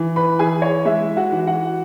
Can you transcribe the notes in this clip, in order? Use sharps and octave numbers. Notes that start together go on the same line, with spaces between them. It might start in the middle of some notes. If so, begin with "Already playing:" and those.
Already playing: E3
B4 B5
E3 G#4 G#5
C#5
G#3 E5
F#4 F#5
E3
F#4 F#5